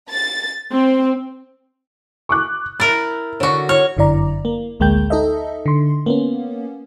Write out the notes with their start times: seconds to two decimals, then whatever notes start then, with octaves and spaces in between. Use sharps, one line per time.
0.11 A6
0.72 C4
2.29 C#6 D6 F#6
2.80 E4 A#4 A6
3.40 D3 F#4 C#5 C#6
3.69 C#5 F6
3.97 G1 F#2 D3 E4 D5 A#5
4.45 A#3
4.80 A1 D2 G#3 A#3 G5 G6
5.10 D#4 A4 D#5 E5
5.66 D3 C6
6.06 A#3 B3 C#4